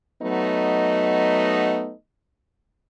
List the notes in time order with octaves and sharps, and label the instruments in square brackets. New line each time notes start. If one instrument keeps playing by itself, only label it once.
[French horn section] F#3 A3 B3 D#4 D#5